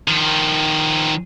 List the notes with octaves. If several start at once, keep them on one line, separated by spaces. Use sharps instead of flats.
D#3 F3